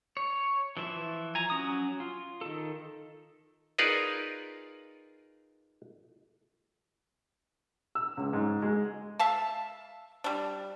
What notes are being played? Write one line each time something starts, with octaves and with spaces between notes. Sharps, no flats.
C#5
E3 F3 E5
G#5 A#5
F#3 C#4 D#6
F4
D#3 A4
D#4 F4 G#4 A#4 B4 D5
E6
C#2
G#2
G#3
E5 F5 A5
G3 D4